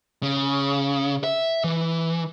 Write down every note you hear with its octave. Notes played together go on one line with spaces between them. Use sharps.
C#3
E5
E3